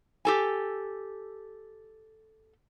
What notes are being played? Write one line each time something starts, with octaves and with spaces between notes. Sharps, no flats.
G4 A4 G#5